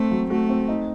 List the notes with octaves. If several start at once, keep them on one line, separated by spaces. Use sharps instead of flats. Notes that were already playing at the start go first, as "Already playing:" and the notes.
Already playing: A3 C4
F#3
A3 F#4
C4
D#4